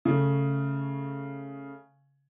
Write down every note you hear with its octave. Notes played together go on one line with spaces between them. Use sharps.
C#3 A3